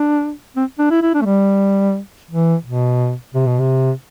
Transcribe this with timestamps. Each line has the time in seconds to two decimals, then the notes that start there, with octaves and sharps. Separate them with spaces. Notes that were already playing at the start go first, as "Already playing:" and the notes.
Already playing: D4
0.56 C4
0.79 D4
0.91 E4
1.02 E4
1.14 D4
1.21 A3
1.25 G3
2.31 E3
2.65 B2
3.34 C3
3.47 B2
3.60 C3